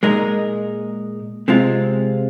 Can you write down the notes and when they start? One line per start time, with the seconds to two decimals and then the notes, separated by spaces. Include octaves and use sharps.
0.03 A#2 G#3 D#4 A#4
1.48 C3 G#3 C4 F4